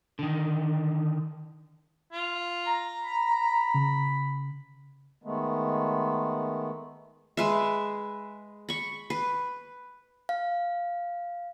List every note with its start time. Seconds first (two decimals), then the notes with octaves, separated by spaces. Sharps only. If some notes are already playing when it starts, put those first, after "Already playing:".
0.19 D3 D#3
2.12 F4
2.67 A#5
3.04 B5
3.74 C#3
5.24 D#3 G#3 A3 B3
7.37 G#3 B4 E5
8.69 B5 C#6
9.10 B4
10.29 F5